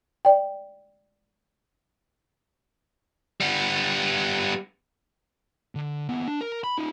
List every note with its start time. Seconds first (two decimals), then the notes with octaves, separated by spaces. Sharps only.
0.25 D5 G5
3.40 G3 B3
5.75 D3
6.09 D#2 B3
6.28 D4
6.41 A#4
6.64 B5
6.78 D#4 F4